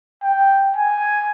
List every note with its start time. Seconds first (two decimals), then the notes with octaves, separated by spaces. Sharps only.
0.23 G5
0.76 G#5